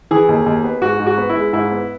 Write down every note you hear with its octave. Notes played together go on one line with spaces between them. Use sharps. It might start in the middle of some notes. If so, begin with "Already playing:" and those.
E3 G#4
D#2
D#2
B3
G#2 F#4
G#2
F#4
B3
E4
G#3
G#2 E4
B3